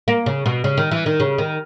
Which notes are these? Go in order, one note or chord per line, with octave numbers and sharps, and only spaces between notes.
A#3
C#3
B2
C#3
D#3
E3
D#3
C#3
D#3